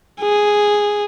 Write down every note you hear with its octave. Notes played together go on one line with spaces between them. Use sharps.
G#4